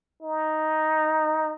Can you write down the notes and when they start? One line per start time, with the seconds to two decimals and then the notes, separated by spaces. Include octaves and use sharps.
0.23 D#4